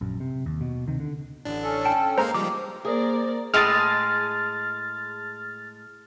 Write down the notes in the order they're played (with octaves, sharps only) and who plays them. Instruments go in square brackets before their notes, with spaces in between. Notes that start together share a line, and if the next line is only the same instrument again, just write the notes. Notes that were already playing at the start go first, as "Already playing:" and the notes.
[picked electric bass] A#1 F#2
C3
D#2
B2
D2 C3 D#3
D3
[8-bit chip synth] A1 D4 [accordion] D3
[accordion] C#4 A4
[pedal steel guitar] G5 [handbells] A5
[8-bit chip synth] G#3 A#3 F5 [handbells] C5 A#5
[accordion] G#2 C#3 [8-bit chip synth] F3 G3 G#3 [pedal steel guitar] D6
[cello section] A#3 [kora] G#4 [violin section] A#4 D5 [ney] C5
[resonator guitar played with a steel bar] A2 G#3 G#4 [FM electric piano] F6 A6